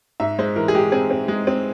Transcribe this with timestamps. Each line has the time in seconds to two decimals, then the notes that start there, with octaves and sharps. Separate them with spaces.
0.20 G#2 E5
0.38 G#3 C5
0.56 E3 A#4
0.68 G#4
0.74 G#3 G4
0.92 C4 G#4
1.10 C4
1.28 G#3
1.47 C4